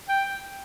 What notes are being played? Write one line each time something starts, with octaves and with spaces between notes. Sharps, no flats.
G5